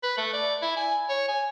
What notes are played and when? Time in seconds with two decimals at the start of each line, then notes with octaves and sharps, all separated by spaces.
0.03 B4
0.17 A3
0.33 D5
0.62 E4
0.77 G#5
1.09 C#5
1.29 G#5